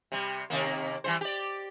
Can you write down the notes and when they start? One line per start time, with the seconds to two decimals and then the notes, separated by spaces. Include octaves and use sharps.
0.12 C3 G3
0.50 C3 D#3 A#3
1.04 E3 G3 C5
1.21 G4 D5